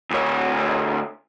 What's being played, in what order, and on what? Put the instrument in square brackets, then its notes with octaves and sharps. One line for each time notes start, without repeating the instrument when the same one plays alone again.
[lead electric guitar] D2 C#5